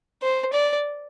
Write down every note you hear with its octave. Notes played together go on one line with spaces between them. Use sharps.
C5
D5